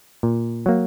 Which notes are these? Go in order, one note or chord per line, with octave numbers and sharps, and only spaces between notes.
A#2
F#3 A#3